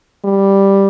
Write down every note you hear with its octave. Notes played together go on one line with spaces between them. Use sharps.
G3